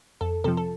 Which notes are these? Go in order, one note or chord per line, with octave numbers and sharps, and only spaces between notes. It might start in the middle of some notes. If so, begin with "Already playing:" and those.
F2 A4
C3 F3 A4
A4